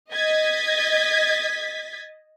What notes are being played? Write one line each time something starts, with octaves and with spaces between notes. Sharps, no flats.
D#5 G#6 A6 B6